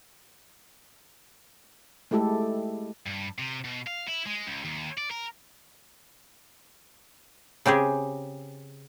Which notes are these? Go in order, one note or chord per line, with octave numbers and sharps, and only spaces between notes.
G#3 A3 E4 G4 A4
G2
C3
B2
F5
E4
G#3
C#2
D#2
D5
A#4
C#3 C4 G4 G#4